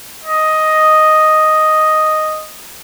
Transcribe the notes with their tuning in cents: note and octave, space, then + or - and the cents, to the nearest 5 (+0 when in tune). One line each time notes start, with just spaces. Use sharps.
D#5 +0